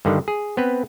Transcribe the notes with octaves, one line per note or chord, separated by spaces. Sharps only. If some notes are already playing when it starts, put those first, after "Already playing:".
G2 D3 D#3
G#4
B3 C4 B4